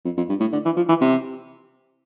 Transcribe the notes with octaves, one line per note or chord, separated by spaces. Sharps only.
F2
F2
G2
A2
D3
E3
F3
E3
C3